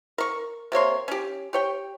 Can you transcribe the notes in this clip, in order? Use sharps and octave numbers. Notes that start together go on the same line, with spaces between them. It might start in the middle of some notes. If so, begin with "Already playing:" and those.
A#4 C#6
C3 A#3 C#5 C6
C#4 G4
G4 C#5 G5